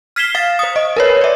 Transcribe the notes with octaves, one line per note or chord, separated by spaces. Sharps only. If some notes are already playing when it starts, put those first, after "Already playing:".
F6 G#6 B6 C7 E7 G7
F5 A6
C5 D#6
D#5
A#4 B4 C#5
D5 E5